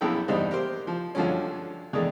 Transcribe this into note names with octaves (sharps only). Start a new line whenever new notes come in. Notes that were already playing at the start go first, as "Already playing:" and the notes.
A#1 F#2 B3 E4 A4 G5
E2 G2 G3 B3 D#4 C5
G4 A#4 C5
F3
G2 D3 F3 F#3 G#3 C#4
E2 D#3 G#3 A3 D4